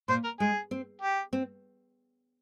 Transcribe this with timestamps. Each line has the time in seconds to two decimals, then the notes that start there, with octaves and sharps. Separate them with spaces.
0.08 A#2 C5
0.24 A#4
0.40 G#3 G#4
0.71 C4
1.01 G4
1.33 C4